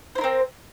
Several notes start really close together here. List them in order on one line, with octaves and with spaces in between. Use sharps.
C5 E4 A#4 C4